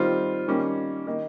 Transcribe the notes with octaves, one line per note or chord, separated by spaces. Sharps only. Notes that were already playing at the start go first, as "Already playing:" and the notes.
Already playing: D#3 G3 C4 F4
D#3 G3 A#3 C#4
D#3 A#3 D#4